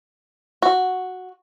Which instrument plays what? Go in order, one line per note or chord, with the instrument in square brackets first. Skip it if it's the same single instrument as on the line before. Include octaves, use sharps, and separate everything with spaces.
[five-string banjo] F#4